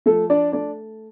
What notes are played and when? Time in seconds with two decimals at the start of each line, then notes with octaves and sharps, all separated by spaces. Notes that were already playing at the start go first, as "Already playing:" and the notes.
0.06 F3 A3 A4
0.30 D4 D5
0.52 A3 D4 D5